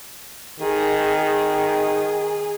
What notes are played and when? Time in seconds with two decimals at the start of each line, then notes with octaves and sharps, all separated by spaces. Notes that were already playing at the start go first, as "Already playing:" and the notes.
0.60 D#3 G#4
1.25 G#4